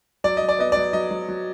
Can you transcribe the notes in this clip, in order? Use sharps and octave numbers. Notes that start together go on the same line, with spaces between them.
F#3 D5
D#5
F#3
D5
B3 D#5
D5
F#3
F#3 D#5
F#3
F#3